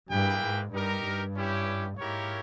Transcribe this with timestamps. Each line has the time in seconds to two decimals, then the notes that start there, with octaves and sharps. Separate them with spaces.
0.11 G2 A#3 E4 G#4 B4 G5
0.41 G#2
0.73 G2 D#4 G4 A#4
1.04 G2
1.35 C#4 E4 G4 C#5
1.97 G#2 A#3 E4 G4 A#4 C#5